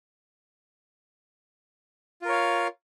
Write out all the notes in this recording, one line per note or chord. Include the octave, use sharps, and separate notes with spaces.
F4 A#4 C#5 F5